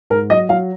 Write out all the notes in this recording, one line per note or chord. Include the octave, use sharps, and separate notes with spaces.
G#2 A#4
F#3 D#5
F#3 F5